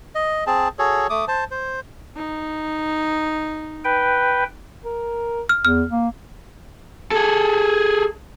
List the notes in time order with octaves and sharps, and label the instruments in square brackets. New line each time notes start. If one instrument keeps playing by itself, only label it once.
[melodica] D#5
C4 G#4 A5
F#4 G#4 A4 C#5
A3 D6 D#6
C5 A5
C5
[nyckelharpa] D#4
[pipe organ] B4 G5
[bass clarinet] A#4
[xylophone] F6
[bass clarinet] E2 [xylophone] F6
[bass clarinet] A#3
[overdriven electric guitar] G#4 A4